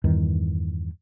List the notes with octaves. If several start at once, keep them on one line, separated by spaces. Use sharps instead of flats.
E2 G2 D#3